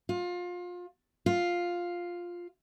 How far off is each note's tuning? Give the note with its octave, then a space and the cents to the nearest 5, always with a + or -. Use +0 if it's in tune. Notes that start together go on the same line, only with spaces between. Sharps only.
F4 +25
F4 +5